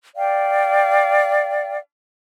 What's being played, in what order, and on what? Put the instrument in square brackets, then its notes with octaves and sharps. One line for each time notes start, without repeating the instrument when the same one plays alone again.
[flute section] D5 F5 G5